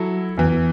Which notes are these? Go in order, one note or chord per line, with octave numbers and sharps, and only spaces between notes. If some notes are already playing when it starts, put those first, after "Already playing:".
Already playing: F#3 E4 A4
E2 E3